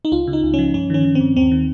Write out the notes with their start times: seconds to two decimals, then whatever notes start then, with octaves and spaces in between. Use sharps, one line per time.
0.05 D#4
0.12 C#2 F4
0.27 C#3
0.33 D#4
0.43 C#2
0.54 F3 C#4
0.74 G2 C#4
0.90 D#3 C#4
1.04 D#3
1.15 C4
1.20 G2
1.36 D#2 C4
1.51 D#3